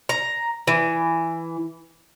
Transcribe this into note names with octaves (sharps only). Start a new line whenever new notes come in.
A#5
E3